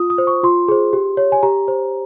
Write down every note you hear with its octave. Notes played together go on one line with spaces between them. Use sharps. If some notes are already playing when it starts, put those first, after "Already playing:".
Already playing: F4 D#6
D#6
C5
C#6
F4 C6
G#4 C5
G4
C#5
G#5
G4 A#5
C5